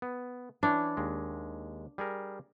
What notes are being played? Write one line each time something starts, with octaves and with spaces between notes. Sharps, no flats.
B3
E3 D4 C#5
D#2 G#3
G3 G#4 A#4